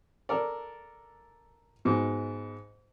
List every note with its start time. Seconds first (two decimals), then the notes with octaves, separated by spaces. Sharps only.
0.29 A4 A#4 D5
1.85 G#2 B2